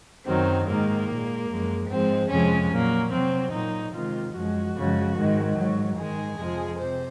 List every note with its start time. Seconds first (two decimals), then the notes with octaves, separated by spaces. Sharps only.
0.26 F#2 D#3 F#3 C4
0.67 G#2 D#3 G#3 A#3
1.08 A#2 G#3
1.49 F#2 F3 G#3
1.89 G#2 F3 G#3 C4
2.30 F2 C3 F3 G#3 C#4
2.71 A#2 F#3 A#3
3.11 C3 F#3 C4
3.52 A#2 F#3 D#4
3.93 C3 D#3 G#3 F4
4.34 F#2 F3 G#3 F#4
4.75 F#2 C#3 F3 G#3
5.16 G#2 D#3 G#3
5.56 G#2 F#3
5.97 G#2 D#3 G#3 G#4
6.38 F2 C3 F3 G#3
6.78 C3 C5